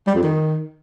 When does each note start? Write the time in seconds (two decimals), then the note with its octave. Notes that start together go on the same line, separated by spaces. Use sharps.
0.07 G3
0.15 F2
0.23 D#3